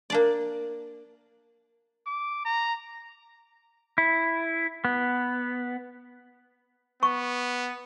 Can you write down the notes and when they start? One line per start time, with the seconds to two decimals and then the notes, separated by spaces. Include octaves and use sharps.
0.10 A#3 D4 D5
2.06 D6
2.45 A#5
3.98 E4
4.85 B3
7.03 B3 C#6